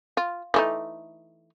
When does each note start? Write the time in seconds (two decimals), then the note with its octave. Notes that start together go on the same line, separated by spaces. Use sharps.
0.17 F4
0.54 E3 A3 D#4